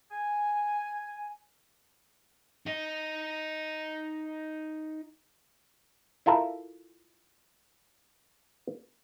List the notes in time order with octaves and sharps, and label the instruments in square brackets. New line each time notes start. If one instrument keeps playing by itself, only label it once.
[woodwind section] G#5
[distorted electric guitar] D#4 D#5
[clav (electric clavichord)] E4 F4 A4 A#4 E5